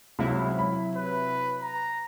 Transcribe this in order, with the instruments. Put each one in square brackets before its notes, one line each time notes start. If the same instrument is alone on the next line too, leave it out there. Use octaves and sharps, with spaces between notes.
[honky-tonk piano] C#2 [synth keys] C3 F#3 E4
[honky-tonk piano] B5
[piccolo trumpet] B4
A#5